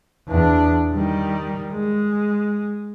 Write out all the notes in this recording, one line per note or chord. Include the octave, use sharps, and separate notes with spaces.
E2 D4
D#3 G3
G#3